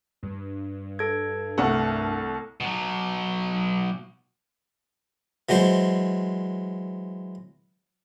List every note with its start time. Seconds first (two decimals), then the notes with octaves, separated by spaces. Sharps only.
0.23 G2
0.99 A4 G#6
1.58 C2 A3 F#5
2.60 B2 F#3
5.49 E3 F#3 G#3 C5